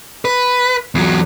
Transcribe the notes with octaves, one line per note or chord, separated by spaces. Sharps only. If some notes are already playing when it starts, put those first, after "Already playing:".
B4
E2 F#3